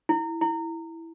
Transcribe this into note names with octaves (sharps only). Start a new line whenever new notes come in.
E4
E4